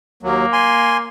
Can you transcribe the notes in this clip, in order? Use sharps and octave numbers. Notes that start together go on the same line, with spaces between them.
D#2 F#3 A#3
G#5 C6